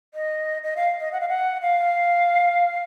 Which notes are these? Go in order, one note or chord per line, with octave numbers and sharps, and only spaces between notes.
D#5
D#5
F5
D#5
F#5
F5
F#5
F5